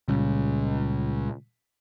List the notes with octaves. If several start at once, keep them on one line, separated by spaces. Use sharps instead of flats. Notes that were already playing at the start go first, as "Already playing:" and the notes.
C#2 A#2 C#3 G3